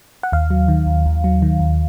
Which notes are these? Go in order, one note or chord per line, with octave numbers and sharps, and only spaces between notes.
F#5
D#2 F5
F#3
D#3
D#2
D#2
F#3
D#3
D#2